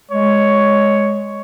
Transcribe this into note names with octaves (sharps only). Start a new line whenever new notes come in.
G#3 C#5